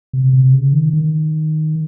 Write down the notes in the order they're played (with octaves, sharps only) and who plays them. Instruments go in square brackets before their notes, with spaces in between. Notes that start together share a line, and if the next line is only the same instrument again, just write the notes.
[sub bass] C3
C3
C#3
D#3
D#3